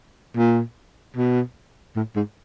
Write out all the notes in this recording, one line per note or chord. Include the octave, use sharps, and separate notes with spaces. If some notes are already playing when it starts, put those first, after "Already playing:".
A#2
B2
A2
G#2